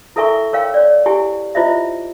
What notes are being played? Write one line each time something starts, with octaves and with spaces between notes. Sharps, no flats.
E4 A4 A#4 E5 G#5 C#6
A#4 C#5 F5 G5
C#5 D5
E4 G4 G#5
E4 F4 C5 D#5 E5